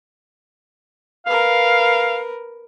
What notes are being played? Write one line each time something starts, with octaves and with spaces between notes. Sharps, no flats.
A#4 B4 F5